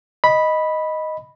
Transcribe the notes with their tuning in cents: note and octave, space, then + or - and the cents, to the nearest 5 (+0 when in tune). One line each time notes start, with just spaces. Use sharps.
D#5 +0 B5 -5